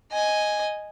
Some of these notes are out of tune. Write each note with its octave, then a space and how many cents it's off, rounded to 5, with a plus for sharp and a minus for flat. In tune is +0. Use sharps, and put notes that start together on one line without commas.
D#5 +0 G#5 +0